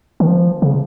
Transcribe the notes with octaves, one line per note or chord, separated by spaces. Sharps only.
D#3
F3
C#3